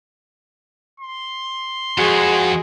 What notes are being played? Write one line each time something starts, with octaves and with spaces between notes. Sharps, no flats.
C6
F2 G#3 F#4 G#4